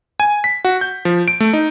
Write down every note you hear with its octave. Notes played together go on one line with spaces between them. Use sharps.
G#5
B6
F#4
G6
F3
D7
A3
D#4